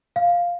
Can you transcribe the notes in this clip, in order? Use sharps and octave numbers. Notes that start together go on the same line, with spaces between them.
F5